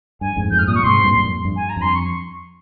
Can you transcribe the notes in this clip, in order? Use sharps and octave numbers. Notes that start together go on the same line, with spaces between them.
G2 G#5
F2 G#2
F2 G#2 G6
F6
G2 A#2 D#6
C#6
G#2 C3 C6
G2 A#2
G2
F2
G2
G#5
A#5
F2
C6
C#6